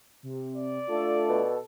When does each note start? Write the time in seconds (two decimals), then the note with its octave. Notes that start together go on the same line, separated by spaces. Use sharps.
0.23 C3
0.56 D5
0.89 A3 D4 F4 A4
1.29 B2